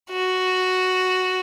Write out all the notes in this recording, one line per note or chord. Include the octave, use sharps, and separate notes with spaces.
F#4